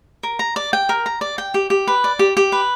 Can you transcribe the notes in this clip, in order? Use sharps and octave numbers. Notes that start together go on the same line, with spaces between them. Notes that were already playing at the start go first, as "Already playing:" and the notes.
A#4
A#5
D5
G5
A#4
A#5
D5
G5
G4
G4
B4
D5
G4
G4
B4